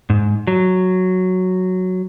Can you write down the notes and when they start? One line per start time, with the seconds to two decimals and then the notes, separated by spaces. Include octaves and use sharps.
0.10 G#2
0.47 F#3